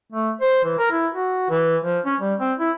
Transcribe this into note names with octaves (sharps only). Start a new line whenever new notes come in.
A3
C5
E3
A#4
E4
F#4
E3
F3
C#4
G3
C4
E4